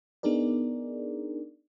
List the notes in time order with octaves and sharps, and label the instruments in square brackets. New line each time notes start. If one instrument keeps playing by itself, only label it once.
[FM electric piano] B3 D4 D#4 G#4 A#4 D5